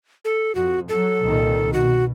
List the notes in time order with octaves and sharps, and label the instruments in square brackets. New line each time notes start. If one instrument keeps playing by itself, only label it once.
[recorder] A4
[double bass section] F2 [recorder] F#4
[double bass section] F#3 [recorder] A4
[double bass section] C2 A#2 D#3
[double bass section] B2 [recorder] F#4